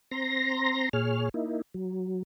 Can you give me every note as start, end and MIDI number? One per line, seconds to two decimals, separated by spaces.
0.11 0.89 60
0.11 0.89 82
0.11 0.89 84
0.11 0.89 94
0.93 1.29 46
0.93 1.29 68
0.93 1.29 73
0.93 1.29 89
1.34 1.62 58
1.34 1.62 63
1.34 1.62 64
1.74 2.23 54